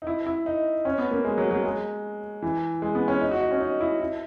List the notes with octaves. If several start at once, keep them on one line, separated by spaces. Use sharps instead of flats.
D#4
E4
E4
D#4
C#4
B3
A#3
G#3
F#3
F#3
G#3
E3
G#3
B3
C#4
D#4
F#4
D#4
C#4
D#4
E4
E4